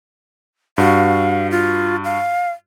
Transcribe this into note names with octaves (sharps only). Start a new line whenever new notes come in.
G2 F#4 F5
F4
F5